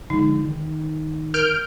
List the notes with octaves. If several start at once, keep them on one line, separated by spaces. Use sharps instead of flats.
D3 F3 G#3 D#4
D#3
A#4 F6 G6 D7